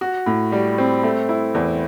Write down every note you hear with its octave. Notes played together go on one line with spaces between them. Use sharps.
F#4
A2
G3
C4
A3
E4
E2